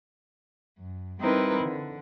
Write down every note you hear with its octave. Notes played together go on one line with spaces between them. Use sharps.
F#2
G3 C4 D#4 E4 A#4 B4
D3